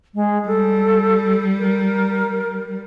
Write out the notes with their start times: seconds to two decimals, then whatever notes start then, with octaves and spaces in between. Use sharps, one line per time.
0.15 G#3
0.47 G3 A4
1.59 A#4